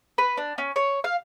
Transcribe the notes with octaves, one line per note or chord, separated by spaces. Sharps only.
B4
D4
C#4
C#5
F5